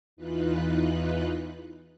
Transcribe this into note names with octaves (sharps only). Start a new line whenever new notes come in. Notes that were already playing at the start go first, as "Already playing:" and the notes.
E2 E3 D#4 F4 B4 F#6